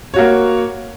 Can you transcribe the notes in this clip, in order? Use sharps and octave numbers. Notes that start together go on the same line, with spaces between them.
A#3 F#4 C#5